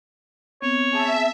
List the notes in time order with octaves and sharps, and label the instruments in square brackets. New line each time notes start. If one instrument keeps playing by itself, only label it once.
[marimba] B3 C4 [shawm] C#5
[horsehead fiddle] G#4 A5 [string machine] E5